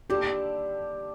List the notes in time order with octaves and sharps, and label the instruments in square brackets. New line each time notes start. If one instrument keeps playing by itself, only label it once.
[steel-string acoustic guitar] D#2 D3 G3 D4 A4 [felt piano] G4